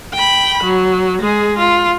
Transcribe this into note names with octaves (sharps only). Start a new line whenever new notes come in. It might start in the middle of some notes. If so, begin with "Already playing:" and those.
G5 B5
F#3
G#3 G#4
F4